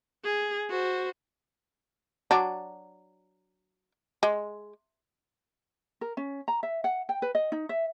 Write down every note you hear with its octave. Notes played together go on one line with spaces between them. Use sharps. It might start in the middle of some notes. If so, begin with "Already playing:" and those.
G#4
F#4 C5
F#3 D4
G#3
A#4
C#4
A#5
E5
F#5
G5
B4
D#5
D#4
E5